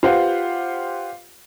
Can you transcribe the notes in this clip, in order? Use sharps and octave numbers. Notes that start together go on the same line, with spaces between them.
F4 G4 B4 C5 F5 F#5